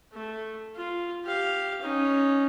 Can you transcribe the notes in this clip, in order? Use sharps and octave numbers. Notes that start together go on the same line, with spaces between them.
A3
F4
G4 F5
C#4 D#4